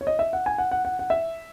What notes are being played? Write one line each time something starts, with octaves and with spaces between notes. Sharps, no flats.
C#5
D#5
E5
F#5
G#5
F#5
F#5
F#5
F#5
E5